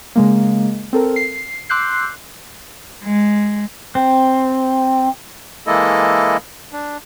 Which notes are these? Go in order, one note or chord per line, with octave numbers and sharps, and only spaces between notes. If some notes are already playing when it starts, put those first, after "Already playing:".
C#3 G#3 A#3
C4 A4 A#4
C7
C6 D6 E6 F#6 G6 C7
G#3
C4
E3 G#3 A#3 E4 A4 D#5
D4